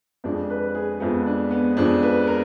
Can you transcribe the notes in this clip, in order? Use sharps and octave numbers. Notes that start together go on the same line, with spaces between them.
F2 F3 G#3 D4
B4
G#4
F2 F3 G#3 B3
D4
B3
F2 F3 G#3 D4
B4
A#4